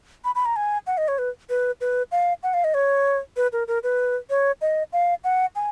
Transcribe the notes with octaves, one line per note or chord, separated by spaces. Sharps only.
B5
B5
A#5
G#5
F#5
D#5
C#5
B4
B4
B4
F5
F#5
F5
D#5
C#5
B4
A#4
A#4
B4
C#5
D#5
F5
F#5
G#5